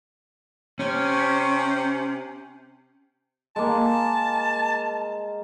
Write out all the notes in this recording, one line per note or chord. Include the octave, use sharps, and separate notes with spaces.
C3 C#4
G#3 A#3 A5